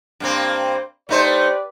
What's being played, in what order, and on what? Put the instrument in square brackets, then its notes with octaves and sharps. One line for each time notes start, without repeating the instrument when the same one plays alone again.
[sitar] G2 A#3 C4
[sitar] A3 D#4 C5 [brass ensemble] G4 B4 D5